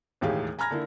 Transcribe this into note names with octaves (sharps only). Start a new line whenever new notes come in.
E1 D#2 A2 G4 G#4 F5
G#5 A#5 B5 F6 G#6 A#6
D3 A#3 E4